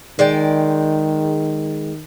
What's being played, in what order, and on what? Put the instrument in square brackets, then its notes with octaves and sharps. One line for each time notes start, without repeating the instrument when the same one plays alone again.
[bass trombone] D#3 [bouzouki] G#3 D5 G5